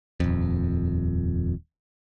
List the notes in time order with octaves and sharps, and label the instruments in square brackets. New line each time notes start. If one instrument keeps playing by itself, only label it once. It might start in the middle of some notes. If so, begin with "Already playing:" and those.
[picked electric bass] D#1 F2